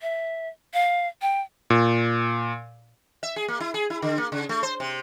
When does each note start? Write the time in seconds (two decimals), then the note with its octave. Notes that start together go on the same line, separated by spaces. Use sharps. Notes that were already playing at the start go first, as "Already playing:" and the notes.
0.01 E5
0.74 F5
1.22 G5
1.70 A#2
3.23 E5
3.36 G#4
3.48 A#3
3.60 E4
3.74 G#4
3.90 E4
4.02 D3
4.18 A#3
4.32 C#3
4.49 A3
4.63 C5
4.80 C3